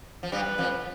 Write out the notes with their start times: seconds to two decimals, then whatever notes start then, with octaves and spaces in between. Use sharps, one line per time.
0.23 F3
0.32 G2 G3 B4
0.58 F2 F3